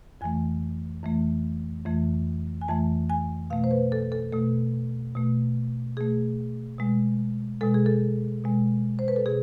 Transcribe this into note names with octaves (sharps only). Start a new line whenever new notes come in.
F2 E3 A3 G#5
F2 E3 A3
F2 E3 A3
G#5
F2 E3 A3 A5
G#5
B2 A3 F5
C5
B4
A4
A4
B2 A3 A4
B2 A3
B2 A3 G#4
B2 G#3
B2 G#3 A4
G#4
A4
B2 G#3
C5
B4
A4
B2 G#4